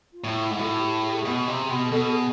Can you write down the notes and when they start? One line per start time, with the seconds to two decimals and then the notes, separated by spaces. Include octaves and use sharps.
0.13 F4
0.24 A2
0.36 F4
0.48 G#2 F4
0.59 A2 F#4
0.80 G4
1.03 G#4
1.11 G4
1.19 G#4
1.25 B2
1.47 C3
1.70 B2
1.92 B2 A4
2.09 G#4